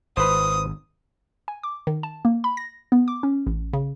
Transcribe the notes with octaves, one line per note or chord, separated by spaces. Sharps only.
G#1 B4 C5 D#6
G#5
D6
D#3
A5
A#3
B5
A#6
B3
D6
C#4
A1
C#3